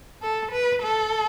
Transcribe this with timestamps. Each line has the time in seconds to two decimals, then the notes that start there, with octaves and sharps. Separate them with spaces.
0.22 A4
0.52 B4
0.82 A4